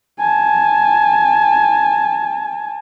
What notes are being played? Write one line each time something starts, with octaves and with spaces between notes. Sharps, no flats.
G#5 A5